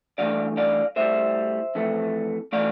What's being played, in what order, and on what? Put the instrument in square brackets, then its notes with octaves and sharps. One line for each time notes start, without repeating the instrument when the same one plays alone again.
[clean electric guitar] G2 E3 A3 D5 F5
D5 F5
A2 G3 C5 E5
F2 E3 A3
E3 A3 D5 F5